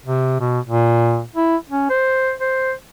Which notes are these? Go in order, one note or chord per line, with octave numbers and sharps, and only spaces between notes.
C3
B2
A#2
E4
C#4
C5
C5